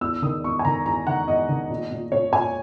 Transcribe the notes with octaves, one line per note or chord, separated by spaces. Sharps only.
E2 E6
D#3 D#6
E2 C#6
G#5
D#3 A#5
E2 A#5
D#3 F#5
E2 D#5
D#3
A#2
A#2
A#2 C#5
A#2 G#5